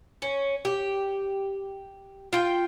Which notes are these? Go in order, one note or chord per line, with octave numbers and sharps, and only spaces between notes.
C#4
G4
F4 G5